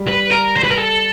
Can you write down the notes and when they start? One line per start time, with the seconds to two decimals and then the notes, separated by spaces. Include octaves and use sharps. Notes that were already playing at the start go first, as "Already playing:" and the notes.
Already playing: G3
0.08 B4
0.32 A#4
0.56 C5
0.64 B4
0.71 A#4
0.78 A4